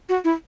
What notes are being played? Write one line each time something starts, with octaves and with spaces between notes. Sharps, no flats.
F#4
E4